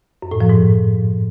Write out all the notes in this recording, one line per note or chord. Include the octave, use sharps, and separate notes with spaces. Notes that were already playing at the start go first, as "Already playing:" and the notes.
F#2
A2
F3
G#2